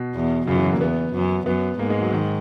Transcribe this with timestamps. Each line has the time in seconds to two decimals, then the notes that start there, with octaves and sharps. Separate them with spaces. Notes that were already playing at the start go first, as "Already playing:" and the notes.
Already playing: B2
0.15 E2
0.47 F#2 C#3
0.56 E3
0.65 F#3
0.73 A#3
0.81 E2 B3
1.13 F#2
1.46 F#2 B3
1.79 G#2 A#3
1.90 G#3
2.01 F#3
2.12 D#3